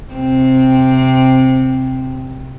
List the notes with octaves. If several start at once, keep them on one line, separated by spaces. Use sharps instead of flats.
C3 C4